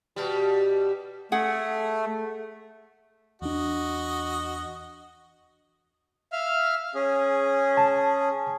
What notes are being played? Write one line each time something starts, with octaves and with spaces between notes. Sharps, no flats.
B2 G3
A3 G#4 F#5
E2 D4 F#4 D#5
E5 F5 F6
C#4 G#4
A5